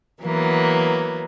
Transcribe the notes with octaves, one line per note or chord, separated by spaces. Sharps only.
E3 F#3 A#3 B3